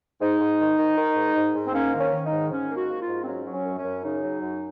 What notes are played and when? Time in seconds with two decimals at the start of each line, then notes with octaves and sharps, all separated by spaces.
0.21 G#2 D#4
0.41 G#2
0.60 D#3
0.78 D#3
0.97 D#3
1.16 G#2
1.36 G#2
1.55 G#2
1.67 C4
1.73 A#3 C#4
1.93 D#3
1.99 C#4
2.12 D#3
2.25 D#4
2.32 G#2
2.51 G#2 C#4
2.70 A#3
2.76 F#4
2.88 A#3
3.01 F4
3.08 G#2
3.22 C4
3.26 F#3 C#4
3.46 F#3
3.53 C#4
3.65 F#2
3.78 C#4
3.84 F#2
4.04 C#3 D#4
4.22 F#3
4.41 F#2